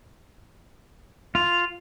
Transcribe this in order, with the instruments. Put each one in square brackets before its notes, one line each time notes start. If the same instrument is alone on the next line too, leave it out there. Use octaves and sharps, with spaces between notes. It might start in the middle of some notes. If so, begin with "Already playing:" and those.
[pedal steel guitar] F4 [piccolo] F7